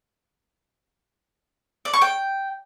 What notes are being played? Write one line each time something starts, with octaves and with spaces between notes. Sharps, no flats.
D5
C#6
G5